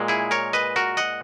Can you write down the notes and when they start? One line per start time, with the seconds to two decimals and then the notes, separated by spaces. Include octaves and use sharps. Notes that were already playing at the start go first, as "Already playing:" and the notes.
Already playing: A#2 G#3
0.08 E4 G#4
0.31 A#4 C#5
0.53 B4 D#5
0.76 F#4 A#4
0.97 D#5 F#5